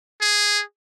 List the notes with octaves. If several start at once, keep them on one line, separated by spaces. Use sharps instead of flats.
G#4